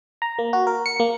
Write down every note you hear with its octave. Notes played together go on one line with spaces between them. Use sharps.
A#5
A#3
F#4
A#4
C#7
A#3